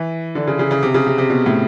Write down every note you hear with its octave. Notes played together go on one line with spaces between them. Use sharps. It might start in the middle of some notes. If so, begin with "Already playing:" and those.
Already playing: E3
D3
C#3
C#3
C#3
C3
C#3
C3
C3
B2
A2